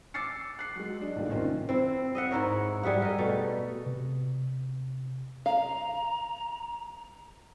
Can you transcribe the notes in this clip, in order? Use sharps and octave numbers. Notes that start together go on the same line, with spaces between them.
D6 E6 A6 C7 C#7
F#6 C7
F#3 G#3
D4 D#5
A1 D#2 A#2 D3 G3
C3 D#3 C4 C#4 D#4 F4
C4 E4
D#5 E5 F#5
G#2 E4 A#4 C#5
G3 G#4 E5 F#5
A#4 D#5
B2 A3
C3
F5 A#5